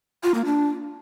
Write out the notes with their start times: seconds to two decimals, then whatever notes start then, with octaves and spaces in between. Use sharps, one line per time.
0.23 F4
0.34 A#3
0.45 D4